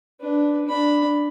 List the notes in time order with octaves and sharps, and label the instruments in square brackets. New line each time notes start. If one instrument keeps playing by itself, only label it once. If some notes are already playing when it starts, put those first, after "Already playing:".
[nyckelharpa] D4 B4
D4 B5